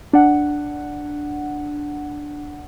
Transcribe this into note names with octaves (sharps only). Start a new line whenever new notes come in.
D4 F#5